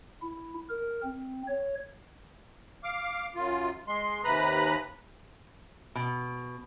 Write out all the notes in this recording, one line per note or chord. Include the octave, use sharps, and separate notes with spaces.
E4
A#4
C4
C#5
F5 D6
F#2 F4
G#3 C6
D#2 C3 B4 A#5 B5
B2